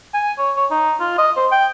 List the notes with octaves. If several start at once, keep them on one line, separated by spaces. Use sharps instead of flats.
G#5
C#5
C#5
D#4
F4
D#5
C5
G5